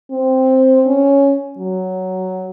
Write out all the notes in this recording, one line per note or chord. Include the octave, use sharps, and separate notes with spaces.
C4
C#4
F#3